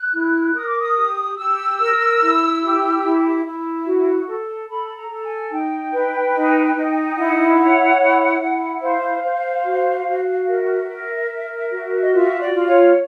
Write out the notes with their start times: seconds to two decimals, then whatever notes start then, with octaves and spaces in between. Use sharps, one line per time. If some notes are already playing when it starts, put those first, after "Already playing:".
Already playing: F#6
0.13 E4
0.54 A#4 D#6
0.67 D6
0.79 D#6
0.96 G4
1.37 G4 E6
1.79 A#4
2.20 E4
2.62 G4
3.02 E4
3.45 E4
3.85 F#4
4.27 A4
4.68 A4 B5
4.95 A#5
5.10 A4
5.23 G#5
5.51 D#4 G5
5.92 B4
6.33 D#4
6.74 D#4
7.16 E4 F#5
7.58 C#5
7.99 E4
8.40 E4
8.81 C5 F5
9.24 C5
9.64 F#4
10.06 F#4
10.47 A#4 E5
10.88 A#4
11.29 A#4
11.71 F#4
12.01 D#5
12.13 F4 E5
12.40 D5
12.54 F4
12.68 C#5